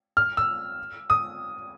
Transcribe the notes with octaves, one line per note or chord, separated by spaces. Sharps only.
F6
E6
D#6